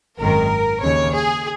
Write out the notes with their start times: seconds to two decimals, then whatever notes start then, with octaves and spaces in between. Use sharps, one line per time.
0.19 G#1 F#2 D#3 A#4
0.82 D#2 C#3 C#5
1.14 G#4